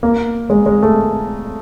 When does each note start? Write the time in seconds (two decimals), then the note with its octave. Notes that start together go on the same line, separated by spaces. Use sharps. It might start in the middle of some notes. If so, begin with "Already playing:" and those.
0.03 A#3
0.50 G#3
0.66 G#3
0.82 A3